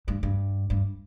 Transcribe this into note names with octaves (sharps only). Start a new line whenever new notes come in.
G2
G2
G2